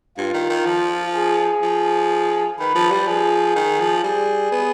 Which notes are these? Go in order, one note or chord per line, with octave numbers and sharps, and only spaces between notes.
G2 F4
D#3
D#3
F3
G#4
F3
D#3 B4
F3
G3
F3 G#4
D#3
F3
G3 G#4
B3